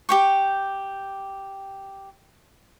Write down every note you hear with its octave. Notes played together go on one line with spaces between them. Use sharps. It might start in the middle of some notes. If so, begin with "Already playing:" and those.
G4 G5 C#6